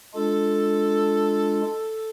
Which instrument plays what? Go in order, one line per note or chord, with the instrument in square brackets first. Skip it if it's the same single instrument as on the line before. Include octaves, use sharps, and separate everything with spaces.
[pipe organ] G#3 D4 F4 [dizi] A4